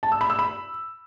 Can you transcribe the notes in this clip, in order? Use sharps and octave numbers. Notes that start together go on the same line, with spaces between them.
A5
E6
B5
E6
B5